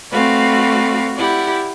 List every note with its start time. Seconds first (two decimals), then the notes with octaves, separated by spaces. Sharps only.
0.11 A3 C4 F#4 B4 D5 F5
1.17 E4 G4 D5 F#5